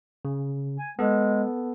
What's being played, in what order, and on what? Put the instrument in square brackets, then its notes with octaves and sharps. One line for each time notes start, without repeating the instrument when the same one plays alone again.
[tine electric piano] C#3
[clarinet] G#5
[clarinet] G#3 [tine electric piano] B3 A4